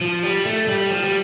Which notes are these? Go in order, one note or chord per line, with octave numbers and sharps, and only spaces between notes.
F3
G3
A3
G3
F3
G3